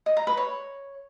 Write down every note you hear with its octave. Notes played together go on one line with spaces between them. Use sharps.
D#5
A#5
B4
C#5